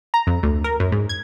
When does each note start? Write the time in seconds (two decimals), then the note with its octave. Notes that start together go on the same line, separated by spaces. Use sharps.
0.14 A#5
0.27 F2
0.43 D2
0.64 A#4
0.80 F#2
0.92 G#2
1.09 G#6